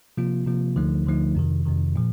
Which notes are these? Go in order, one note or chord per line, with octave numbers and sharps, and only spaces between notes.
C3 F3 A#3 F4
C3 F3 A#3 F4
D2 D3 F3 A3 D#4
D2 D3 F3 A3 D#4
F2 C3 D#3
F2 C3 D#3
A#2 F3